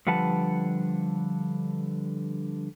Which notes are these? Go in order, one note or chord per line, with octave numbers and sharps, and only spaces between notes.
D3 F3 G3 B4 F#5 A5